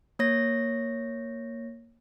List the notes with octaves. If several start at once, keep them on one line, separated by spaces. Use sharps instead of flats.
A#3 C#5 A#6